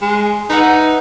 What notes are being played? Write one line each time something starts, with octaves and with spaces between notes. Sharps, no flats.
G#3
D#4 B4 E5 F#5